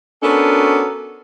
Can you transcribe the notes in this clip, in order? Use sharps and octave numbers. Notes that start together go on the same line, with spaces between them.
B3 C#4 D4 F#4 A4 A#4